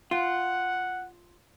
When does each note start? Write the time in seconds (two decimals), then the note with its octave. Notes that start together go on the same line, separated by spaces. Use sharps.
0.11 F4 F#5